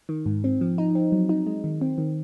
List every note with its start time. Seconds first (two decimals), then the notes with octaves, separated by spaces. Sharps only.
0.09 D#3
0.26 G#2
0.44 C4
0.61 F3
0.78 D#4
0.95 C4
1.12 F#3
1.29 D#4
1.46 G#3
1.64 D#3
1.81 C4
1.98 D#3